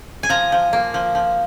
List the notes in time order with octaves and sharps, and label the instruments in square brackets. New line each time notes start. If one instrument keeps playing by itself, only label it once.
[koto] G#5
F3 A#5
F3
A#3
F3
F3